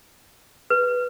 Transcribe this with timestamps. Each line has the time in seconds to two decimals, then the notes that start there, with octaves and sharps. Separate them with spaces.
0.70 B4